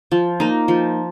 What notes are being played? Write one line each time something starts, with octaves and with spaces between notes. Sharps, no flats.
F3
A#3 D#4
F3